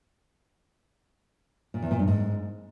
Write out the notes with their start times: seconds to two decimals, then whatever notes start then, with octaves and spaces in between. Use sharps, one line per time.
1.74 A#2
1.82 E2
1.91 A#2
1.99 G2
2.08 G#2